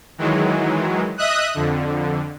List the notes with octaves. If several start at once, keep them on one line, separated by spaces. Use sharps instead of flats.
D#3 E3 F#3 G#3
D#5 E5 D#6 F#6
F2 D3